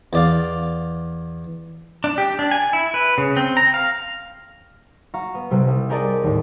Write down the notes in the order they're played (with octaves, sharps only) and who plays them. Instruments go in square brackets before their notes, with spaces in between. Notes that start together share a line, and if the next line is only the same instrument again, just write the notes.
[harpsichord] E2 D5 F5
[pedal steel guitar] D4
G4
D4
G#5
E4
B4
C#3
C4
A#5
F5
[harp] F#4 F5 A#5 C#6
B3
C2 C3 G3
C2
G4 G#4 A#4 D5 D#5 A5
D#2 A2